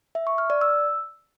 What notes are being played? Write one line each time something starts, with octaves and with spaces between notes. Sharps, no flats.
E5
C#6
F6
D5
E6